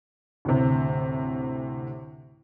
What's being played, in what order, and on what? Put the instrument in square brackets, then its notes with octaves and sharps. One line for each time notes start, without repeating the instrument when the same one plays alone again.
[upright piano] D2 A2 C3